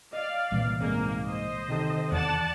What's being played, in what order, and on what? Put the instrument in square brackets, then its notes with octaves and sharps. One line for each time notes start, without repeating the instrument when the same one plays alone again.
[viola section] D5 F5 [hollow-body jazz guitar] D#5
[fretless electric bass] C2 A#2 E3
[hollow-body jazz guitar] G#2 C4 [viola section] A#3
[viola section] C5 D#5
[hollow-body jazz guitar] C3 D#3 A4
[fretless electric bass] E2 [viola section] D5 F#5 A5